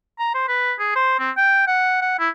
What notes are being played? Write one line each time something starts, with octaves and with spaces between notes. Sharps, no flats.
A#5
C5
B4
G#4
C5
C4
G5
F#5
F#5
E4